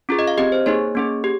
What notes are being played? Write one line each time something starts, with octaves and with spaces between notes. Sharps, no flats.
C#4 F4 G#4
D#5
F5
C4 G4 D#5
C5
A#3 D#4 G#4 C#5
A#3 C#4 G#4
G4